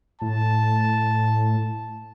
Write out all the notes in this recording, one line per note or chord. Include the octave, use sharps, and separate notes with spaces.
A2 A5